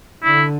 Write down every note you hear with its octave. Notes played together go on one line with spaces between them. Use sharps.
D3 E4